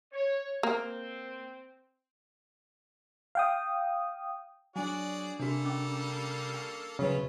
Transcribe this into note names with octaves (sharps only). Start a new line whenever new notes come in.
C#5
A#3 C4
F5 G5 D#6
F#3 D4 F#4 G#4 D5 G#5
C3 G3 A#3 D4 F#4 A4
C#4 C#6 D6
A5 C#6
E2 C#3 F#3 C#4 E4 F4 B4